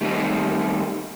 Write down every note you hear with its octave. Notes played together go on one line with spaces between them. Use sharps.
D#3 G3 A3 A#3 C4 D#4